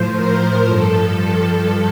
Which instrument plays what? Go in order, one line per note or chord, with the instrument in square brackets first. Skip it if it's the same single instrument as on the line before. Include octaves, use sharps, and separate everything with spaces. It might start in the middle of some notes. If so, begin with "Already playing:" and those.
Already playing: [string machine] A2 F3 C5
A#4
G2 F3 A4